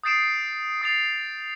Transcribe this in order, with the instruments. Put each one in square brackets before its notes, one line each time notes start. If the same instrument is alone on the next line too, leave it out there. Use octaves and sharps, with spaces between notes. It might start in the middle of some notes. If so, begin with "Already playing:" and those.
[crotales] D#6 G6 A6 C7 D7 E7
D#6 A6 C7 F7